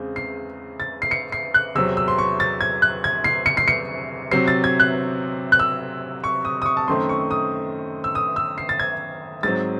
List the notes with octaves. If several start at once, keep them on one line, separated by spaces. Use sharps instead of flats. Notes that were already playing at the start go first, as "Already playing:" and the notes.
Already playing: E2 C#3 G#3 C4
C7
A6
C7
C#7
C7
F#6
E2 C3 F#3 C4 E6
E6
C6
C#6
A6
G#6
F#6
G#6
C7
C#7
C7
C#7
C3 F#3 C4 C7
A6
G#6
F#6
F#6
E6
C#6
D#6
D#6
C#6
A5
F#2 D#3 A3 C4 C6
C#6
D#6
E6
D#6
E6
C7
A6
G#6
G#2 F#3 C4 A6